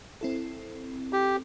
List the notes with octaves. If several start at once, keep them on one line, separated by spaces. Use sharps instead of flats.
C4 E4 A4
G4